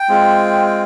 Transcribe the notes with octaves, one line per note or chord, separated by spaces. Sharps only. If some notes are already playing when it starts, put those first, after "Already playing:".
Already playing: G5
G#3 C4 F4
G5